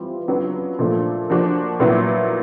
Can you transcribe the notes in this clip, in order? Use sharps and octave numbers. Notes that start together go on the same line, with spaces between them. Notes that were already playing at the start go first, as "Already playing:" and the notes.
Already playing: E3 G3 C4 F4
C#3 F#3 B3 D4 F4
A#2 F3 A3 D4 F4
F3 A#3 D4 F#4
A#2 F#3 B3 E4